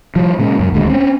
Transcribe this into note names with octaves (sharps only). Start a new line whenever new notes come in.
F3 G3
A#2 C#3 G#3
F#2
D#1 D2 G#3
C4 C#4